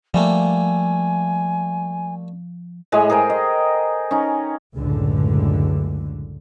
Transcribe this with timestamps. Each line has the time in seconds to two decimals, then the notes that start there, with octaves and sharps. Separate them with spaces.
0.14 F3 G3 A3 A#3 G#5
2.92 A2 G#3 D#5 G#5
3.10 G#4 A#4 C5 G5
3.30 D#5
4.11 C#4 D#4
4.77 C#2 F#2 A2 D3